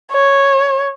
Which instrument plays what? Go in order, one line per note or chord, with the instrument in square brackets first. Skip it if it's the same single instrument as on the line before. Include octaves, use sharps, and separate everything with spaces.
[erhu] C#5